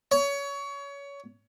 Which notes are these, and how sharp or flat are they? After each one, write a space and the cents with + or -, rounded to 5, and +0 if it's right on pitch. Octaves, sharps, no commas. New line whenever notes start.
C#5 +25